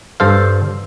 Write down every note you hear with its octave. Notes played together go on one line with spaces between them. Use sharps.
G2 A4 C5 F5